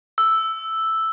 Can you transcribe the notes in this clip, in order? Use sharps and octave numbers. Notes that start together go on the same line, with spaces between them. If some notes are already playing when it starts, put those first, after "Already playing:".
E6